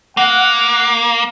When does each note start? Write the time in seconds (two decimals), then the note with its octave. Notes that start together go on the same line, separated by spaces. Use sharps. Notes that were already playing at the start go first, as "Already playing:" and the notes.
0.17 A#3 F#5